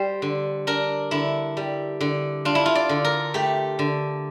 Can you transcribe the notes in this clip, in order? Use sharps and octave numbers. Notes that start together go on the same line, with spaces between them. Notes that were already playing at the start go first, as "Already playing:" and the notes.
Already playing: G3 C5
D3
D4 A#4
D3 E4
G3
D3
D4 F4
E4
F4
D5
D3
A#4
A3 G4
D3